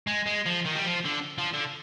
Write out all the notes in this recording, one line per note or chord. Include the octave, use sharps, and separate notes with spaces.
G#3
G#3
F3
D#3
G3
F3
D3
F3
D3